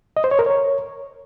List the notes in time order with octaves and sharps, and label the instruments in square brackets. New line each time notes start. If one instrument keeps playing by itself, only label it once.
[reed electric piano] D#5
C5
C#5
A#4
C#5